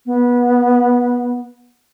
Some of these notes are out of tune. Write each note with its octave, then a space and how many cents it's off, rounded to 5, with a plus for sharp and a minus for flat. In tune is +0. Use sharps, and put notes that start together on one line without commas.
B3 -20